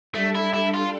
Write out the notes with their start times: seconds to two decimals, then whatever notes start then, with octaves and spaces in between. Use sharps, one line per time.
0.15 G3 A3 D4 A4
0.35 E4
0.54 E4
0.74 F4